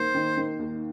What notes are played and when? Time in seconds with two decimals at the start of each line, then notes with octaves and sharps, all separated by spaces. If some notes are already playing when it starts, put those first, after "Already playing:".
Already playing: D#3 A#3 C5
0.15 D#3
0.37 D#3
0.59 D#2